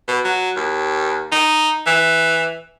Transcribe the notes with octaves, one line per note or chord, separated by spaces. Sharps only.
B2
F#3
D#2
D#4
E3